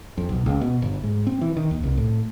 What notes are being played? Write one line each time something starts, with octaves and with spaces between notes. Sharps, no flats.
F2
B1
C#2
B2
G1
G#2
C4
E3
D#3
D#2
C2
A2